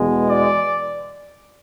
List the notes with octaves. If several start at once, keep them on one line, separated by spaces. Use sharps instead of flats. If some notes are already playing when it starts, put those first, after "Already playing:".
Already playing: E2 B2 G#3
D5